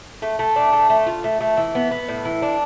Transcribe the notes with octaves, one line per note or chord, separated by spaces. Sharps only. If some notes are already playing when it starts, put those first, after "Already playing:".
A3
A3
D4
A3
A3
F4
A3
A3
E3
B3
B3
A2
E3
D4